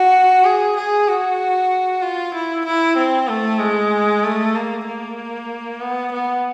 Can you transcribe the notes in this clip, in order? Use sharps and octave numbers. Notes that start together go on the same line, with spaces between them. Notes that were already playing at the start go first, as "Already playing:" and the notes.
Already playing: F#4
G#4
G#4
F#4
F4
E4
E4
C4
A3
G#3
A3
A#3
A#3
B3
B3